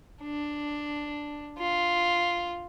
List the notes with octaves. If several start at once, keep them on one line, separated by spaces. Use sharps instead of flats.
D4
F4